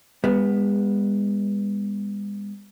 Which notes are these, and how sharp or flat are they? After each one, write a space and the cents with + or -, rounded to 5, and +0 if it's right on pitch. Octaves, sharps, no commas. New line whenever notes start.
G#3 -40 B3 +0